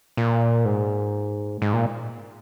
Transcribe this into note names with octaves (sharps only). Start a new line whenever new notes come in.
A#2
G#2
G#2
A#2